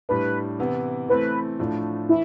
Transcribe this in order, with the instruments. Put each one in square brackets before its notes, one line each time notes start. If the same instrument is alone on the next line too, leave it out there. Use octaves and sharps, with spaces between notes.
[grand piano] A2 G3 D4 [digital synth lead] B4
[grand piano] C3 E3 B3 E4
[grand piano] E3 A3 C4 [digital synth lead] B4
[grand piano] A2 F3 A3 D4
[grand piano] E3 [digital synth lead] E4